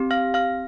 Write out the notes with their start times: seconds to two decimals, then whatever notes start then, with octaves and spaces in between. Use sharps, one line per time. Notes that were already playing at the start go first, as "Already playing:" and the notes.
Already playing: C4 G4
0.11 F5 F6
0.34 F5 F6